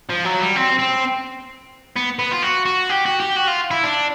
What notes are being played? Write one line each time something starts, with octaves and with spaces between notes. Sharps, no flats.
F3
F#3
G3
C4
C4
B3
B3
F4
F#4
F#4
G4
F#4
G4
F#4
F4
E4
D4